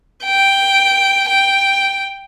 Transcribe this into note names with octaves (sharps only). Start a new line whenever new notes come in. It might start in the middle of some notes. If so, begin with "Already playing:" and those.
G5
G5